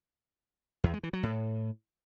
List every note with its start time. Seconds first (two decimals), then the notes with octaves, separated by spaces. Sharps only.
0.84 E2
0.94 G#3
1.03 E3
1.13 F#3
1.23 A2